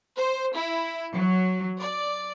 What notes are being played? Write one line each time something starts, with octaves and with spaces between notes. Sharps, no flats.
C5
E4
F#3
D5